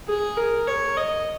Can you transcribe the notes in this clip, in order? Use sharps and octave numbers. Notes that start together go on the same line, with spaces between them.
G#4
A#4
C#5
D#5